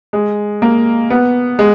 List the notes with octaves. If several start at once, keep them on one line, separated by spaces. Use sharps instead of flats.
G#3
A#3
B3
G#3